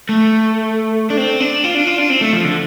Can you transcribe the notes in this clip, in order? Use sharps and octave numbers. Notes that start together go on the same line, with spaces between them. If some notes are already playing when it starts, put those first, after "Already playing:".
A3
D4
C4
D4
F4
D4
F4
D4
C4
A3
F3
D3